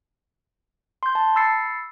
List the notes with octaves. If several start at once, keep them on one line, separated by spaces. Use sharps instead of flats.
C6 G6
A5
B5 E6 A6 C7 C#7